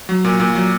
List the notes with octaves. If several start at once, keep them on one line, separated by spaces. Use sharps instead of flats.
F#3
A#2
A#2
F#3